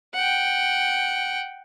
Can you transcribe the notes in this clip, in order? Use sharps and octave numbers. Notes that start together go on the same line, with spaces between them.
F#5 G5